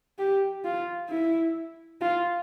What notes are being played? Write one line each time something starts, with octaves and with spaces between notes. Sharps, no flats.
G4
F4
E4
F4